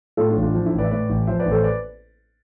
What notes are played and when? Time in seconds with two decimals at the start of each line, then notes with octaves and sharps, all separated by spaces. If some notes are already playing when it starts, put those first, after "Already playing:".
0.17 A2 F4 A4
0.29 D4 F4
0.36 A1
0.42 D4 F4
0.54 F3 D4
0.66 E4
0.73 A1
0.79 B4 D5
0.84 E5
0.91 A2 B4 D5
1.09 A1
1.27 F3 C5 E5
1.39 B4 D5
1.45 A1
1.51 A4 C5
1.64 B4 D5